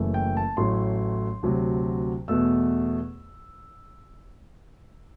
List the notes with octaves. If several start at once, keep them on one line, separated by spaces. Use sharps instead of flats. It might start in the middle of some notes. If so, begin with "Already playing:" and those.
Already playing: F#1 F#2 E3 A3
G5
A5
A1 A2 F#3 A3 C6
D2 C3 F#3
E2 B2 A3 E6